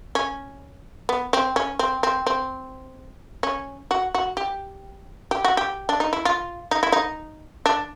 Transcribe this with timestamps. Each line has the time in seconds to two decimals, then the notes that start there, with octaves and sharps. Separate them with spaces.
0.15 C#4
1.09 B3
1.33 C4
1.56 C#4
1.79 C4
2.03 C4
2.27 C4
3.43 C#4
3.91 F#4
4.15 F#4
4.37 G4
5.31 G4
5.45 F#4
5.57 G4
5.89 D4
6.00 D#4
6.13 E4
6.25 F4
6.71 D#4
6.83 E4
6.92 D#4
7.66 D4